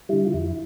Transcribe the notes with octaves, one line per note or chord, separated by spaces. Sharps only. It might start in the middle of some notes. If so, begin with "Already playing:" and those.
D3 G3 E4
F4
F2 E4